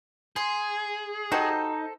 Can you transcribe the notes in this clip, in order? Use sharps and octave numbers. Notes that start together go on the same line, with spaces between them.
G#4 C6
D#4 F#4 G4 A4 C5 D#5